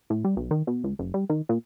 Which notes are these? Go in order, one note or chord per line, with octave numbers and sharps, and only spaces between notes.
A2
G3
B1
D#3
B2
C#2
F#1
G3
D#3
A#2